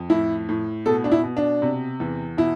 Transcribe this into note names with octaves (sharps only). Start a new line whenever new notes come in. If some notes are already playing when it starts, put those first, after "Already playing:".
Already playing: F2
A2 E4
A2
B2 A4
D4
E4
B2
D4
C3
E2
B2 E4